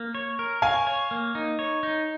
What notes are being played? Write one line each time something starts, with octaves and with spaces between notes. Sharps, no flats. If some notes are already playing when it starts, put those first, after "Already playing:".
Already playing: A#3
C#5
A#4
C#5 F5 G#5
C#5
A#3
D#4
C#5
D#4